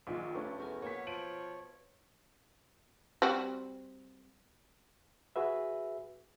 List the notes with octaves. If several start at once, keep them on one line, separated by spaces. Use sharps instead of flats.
A#1 A#2 D#3 G#3
G2 F3 A3 C#4
E2 B2 A#4 G#5
A#3 B4 C#5 E5 F#5 B6
F3 D7 D#7 F#7
G3 C4 F#4
F#4 G#4 B4 E5